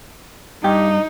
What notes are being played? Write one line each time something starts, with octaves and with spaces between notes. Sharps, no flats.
G2 D#4 G4